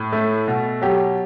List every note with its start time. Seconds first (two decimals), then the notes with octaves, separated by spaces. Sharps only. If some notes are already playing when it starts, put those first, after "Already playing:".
Already playing: A2
0.13 A3
0.48 B2
0.81 F#3 G4